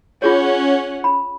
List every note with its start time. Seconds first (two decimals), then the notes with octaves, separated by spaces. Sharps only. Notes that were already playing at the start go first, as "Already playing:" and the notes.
0.22 C#4 F4 G#4 C#5 F#5
1.04 B5